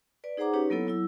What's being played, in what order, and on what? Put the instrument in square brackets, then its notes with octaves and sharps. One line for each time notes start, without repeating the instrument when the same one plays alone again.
[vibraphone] B4 D5
D#4 G#4 C5 F#5 A#5 D6
C#4 D#4 G4 B4 C#5
F#3 A#3 B3 E4 A4 C#5
F#3 E4 E6